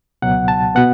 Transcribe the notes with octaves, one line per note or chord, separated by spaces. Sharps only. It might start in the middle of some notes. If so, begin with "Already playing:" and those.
C#2 B2 F#3 F#5
A5
B2 B3 F#5